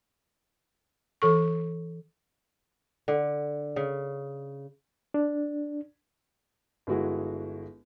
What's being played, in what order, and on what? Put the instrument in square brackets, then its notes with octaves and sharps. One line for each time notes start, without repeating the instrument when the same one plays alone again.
[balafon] E3 A4 C#6
[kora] D3
C#3
[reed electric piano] D4
[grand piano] G1 G#3 E4 F#4 G#4